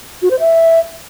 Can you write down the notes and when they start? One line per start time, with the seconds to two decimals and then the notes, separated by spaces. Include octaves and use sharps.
0.22 F#4
0.31 C5
0.39 E5